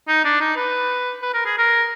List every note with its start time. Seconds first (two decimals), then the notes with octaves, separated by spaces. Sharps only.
0.08 D#4
0.25 D4
0.41 D#4
0.56 B4
1.22 B4
1.34 A#4
1.46 G#4
1.58 A#4